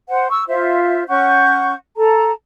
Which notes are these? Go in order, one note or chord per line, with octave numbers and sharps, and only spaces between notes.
C5 F#5
C#6 E6
F4 C5 E5
C#4 F#5 C#6 G6
A4 A5 A#5